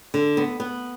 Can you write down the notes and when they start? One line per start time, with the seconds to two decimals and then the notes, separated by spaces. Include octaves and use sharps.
0.14 D3
0.37 B3
0.60 B3